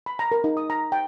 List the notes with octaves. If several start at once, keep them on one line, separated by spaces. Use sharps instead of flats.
B5
A#5
A#4
D#4
D#6
A#5
G5